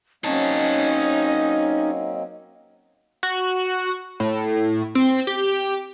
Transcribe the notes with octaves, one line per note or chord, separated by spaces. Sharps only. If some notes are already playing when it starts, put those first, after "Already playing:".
F#3 A#3 C4 C#4 D#4 D#5 A5
F#4
A2
C4
G4